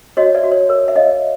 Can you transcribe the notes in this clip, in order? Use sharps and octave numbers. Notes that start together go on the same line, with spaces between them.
F#4 C#5 D#5
D5 E5
F#4
C#5
A#4 C#5
E5
C#5 D#5 F5